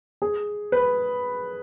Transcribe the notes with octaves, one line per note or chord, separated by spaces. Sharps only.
G#4
B4